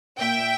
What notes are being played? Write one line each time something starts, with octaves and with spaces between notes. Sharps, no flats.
A#2 E5 G5